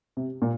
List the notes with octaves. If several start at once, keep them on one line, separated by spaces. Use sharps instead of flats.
C3
A#2